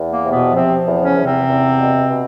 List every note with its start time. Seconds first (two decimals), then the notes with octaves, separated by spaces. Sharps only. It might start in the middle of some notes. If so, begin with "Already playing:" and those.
Already playing: E2
0.08 A#3
0.23 C3
0.30 B2 B3
0.54 C3 F3 C4
0.86 E2
1.01 C#3 C#4
1.16 E2
1.25 C3 C4
1.48 E2
1.79 B2
2.10 B2